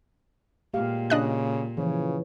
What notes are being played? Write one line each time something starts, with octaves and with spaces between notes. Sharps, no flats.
A#2 G#3 G4 F5
C#3 D4 D#5 F#6
C#3 E3 F3 C#5